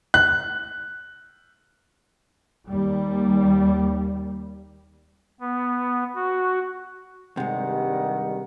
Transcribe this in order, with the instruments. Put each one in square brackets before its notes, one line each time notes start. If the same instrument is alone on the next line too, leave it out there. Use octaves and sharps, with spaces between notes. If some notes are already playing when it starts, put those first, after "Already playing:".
[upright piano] F#6
[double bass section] D#2 G3
[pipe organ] B3
F#4
[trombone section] G2 D#3 G3 [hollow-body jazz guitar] C3 G#3 [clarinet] F#5